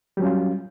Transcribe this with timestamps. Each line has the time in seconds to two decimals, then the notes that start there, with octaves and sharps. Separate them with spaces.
0.17 G3
0.20 F#3
0.22 C#4
0.25 F4